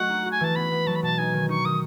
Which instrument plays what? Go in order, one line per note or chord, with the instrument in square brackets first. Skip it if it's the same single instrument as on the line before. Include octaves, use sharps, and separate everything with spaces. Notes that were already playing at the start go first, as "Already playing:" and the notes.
Already playing: [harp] F#3 A3 F#4 D#5 [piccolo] F#5
[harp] D#4
F#4
[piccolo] G#5
[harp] E3 [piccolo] A5
[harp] B3 [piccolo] B5
[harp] B3
[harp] F#3 [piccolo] A5
[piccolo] B5
[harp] B2 [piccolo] A5
[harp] D#4 [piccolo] G#5
[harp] D#3
[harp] D#4 [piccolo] C#6
[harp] D#3 [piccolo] D#6